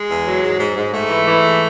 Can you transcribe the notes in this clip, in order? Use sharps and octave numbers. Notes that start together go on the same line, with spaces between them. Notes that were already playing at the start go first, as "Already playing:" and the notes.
Already playing: G#3
E2
F#3
G#2
G#2
G#2
G#2 A3
E3
E3
G#2